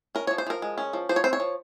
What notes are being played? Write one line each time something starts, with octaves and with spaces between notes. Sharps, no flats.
C#4 A#4
F3 C#5
C5
F3 A#4
G#3
C#4
F3
F3 C5
C#5
C4 C5
C#5
F3